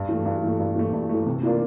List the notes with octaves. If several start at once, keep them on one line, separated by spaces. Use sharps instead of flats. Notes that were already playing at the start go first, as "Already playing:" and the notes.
Already playing: G2
E3 A3
G2
E3 A3
G2
E3 A3
G2
E3 A3
C3
E3 A#3 D4 F4